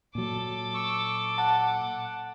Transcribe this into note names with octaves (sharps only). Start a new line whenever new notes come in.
A#2 F#3 A4 D6
C#6 E6
F#5 A5